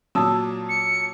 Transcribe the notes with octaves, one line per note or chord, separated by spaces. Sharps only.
A#2 F#3 A5 D#6 E6
C#7